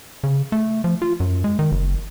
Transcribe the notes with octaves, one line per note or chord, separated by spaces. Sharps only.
C#3
A3
F3
F4
F#2
G#3
D#3
F#1